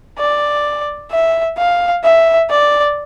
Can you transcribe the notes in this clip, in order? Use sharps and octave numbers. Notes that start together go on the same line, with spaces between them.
D5
E5
F5
E5
D5